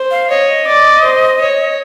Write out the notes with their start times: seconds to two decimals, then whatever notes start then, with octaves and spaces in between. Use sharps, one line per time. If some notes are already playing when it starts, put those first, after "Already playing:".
Already playing: C5
0.11 F5
0.30 C#5 D#5
0.67 D5
1.04 C5
1.41 C#5